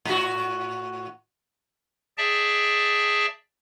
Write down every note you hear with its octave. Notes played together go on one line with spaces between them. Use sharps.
A2 F#4
G#4 D5 E5 G5 A5